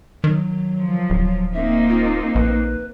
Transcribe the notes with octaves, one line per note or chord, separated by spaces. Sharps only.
D#3 F#3
F3
D1
A#3 C4 D#4 E5
F4
A#1 B4